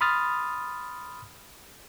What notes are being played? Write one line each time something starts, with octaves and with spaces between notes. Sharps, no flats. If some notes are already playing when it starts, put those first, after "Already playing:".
B5 C6 D#6 F6 A6